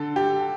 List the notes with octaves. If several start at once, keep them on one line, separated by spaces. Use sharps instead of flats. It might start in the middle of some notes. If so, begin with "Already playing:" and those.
Already playing: D3 A4
G4